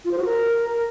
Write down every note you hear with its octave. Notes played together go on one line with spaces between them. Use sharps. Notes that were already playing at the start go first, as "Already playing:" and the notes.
F4
C5
F#4
A#4